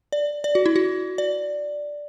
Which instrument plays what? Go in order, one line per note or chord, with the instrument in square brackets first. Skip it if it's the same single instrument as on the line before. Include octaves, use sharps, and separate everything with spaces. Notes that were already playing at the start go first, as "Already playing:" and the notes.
[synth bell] D5
D5
F#4
E4
F#4
D5